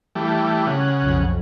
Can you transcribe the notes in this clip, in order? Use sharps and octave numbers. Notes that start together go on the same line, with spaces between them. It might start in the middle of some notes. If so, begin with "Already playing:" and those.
E3 G3 A3
C#3 F#5
B1 F2